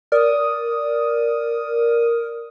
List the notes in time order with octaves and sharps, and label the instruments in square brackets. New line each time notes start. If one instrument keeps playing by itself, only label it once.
[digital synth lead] A#4 [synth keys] D5 [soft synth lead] D#6